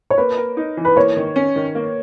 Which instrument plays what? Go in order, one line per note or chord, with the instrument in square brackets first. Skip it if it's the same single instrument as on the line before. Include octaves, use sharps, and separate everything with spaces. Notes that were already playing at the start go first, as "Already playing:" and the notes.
[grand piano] C#5
[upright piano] A#3 [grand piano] B4
[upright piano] A#4
D#4
E3
[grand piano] B4
[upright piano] A#3 [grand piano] C#5
[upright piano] D#3
C#4
D#3
A#3